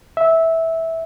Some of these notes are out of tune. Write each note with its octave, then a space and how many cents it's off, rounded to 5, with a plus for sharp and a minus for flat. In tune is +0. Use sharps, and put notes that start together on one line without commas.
E5 -15